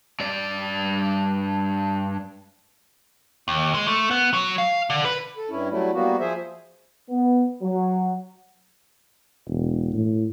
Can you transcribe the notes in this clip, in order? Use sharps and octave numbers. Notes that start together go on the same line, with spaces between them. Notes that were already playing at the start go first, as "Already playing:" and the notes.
G2 D5
D#2
G#3
A3
B3
F#3
F5
D3
B4
A4
G2 C#4 E4
F#3 G3 A3 E4
G3 A#3 B3 F#4
F3 G#4 C5 E5
B3
F#3
E1
A2